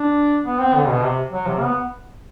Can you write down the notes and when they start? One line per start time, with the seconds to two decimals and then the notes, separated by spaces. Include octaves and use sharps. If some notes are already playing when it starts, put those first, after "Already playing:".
Already playing: D4
0.45 B3
0.60 C4
0.74 D3
0.88 B2
1.03 C3
1.33 F#3
1.47 C3
1.61 B3